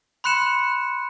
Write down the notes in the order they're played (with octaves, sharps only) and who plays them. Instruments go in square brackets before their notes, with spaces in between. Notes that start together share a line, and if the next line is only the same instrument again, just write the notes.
[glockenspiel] B5 C6 F#6 C#7 E7